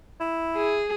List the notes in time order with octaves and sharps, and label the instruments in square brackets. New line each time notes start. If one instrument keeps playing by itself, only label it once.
[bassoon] E4
[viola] G#4